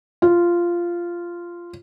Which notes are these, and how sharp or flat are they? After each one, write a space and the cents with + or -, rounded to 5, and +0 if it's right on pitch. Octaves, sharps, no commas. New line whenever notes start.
F4 -10